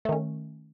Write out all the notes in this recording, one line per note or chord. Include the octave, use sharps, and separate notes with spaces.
D#3 A3 C#4